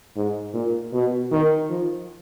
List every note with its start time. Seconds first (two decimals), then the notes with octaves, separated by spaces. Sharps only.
0.16 G#2
0.54 A#2
0.93 B2
1.31 D#3
1.69 F3